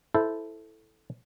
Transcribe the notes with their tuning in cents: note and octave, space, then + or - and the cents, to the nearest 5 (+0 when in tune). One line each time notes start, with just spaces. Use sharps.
E4 +0 A4 -5 C5 -10